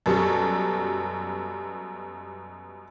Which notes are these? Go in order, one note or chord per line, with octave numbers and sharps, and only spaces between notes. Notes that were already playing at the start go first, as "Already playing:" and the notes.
F#2 B2 G3 A4 C#6